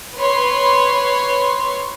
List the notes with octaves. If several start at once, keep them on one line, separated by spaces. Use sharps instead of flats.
B4 C#5 C6